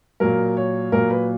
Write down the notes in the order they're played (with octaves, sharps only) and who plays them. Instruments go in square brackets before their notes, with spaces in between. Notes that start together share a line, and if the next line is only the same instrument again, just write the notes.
[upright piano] A#2 F#3 A#4
C#5
A#2 F#3 A#4
B4